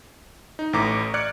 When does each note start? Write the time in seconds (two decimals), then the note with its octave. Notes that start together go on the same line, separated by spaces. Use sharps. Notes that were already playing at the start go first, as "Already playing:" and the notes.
0.59 D#4
0.73 A1 A2 E4 A#5 D6
1.14 D5 D6 F6 F#6 G#6 C#7